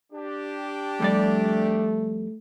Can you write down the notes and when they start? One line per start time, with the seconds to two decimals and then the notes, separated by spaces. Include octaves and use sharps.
0.12 D4 G4
1.00 F2 G3 A3 D5